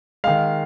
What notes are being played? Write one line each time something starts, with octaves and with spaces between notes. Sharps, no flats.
D#3 G#3 F5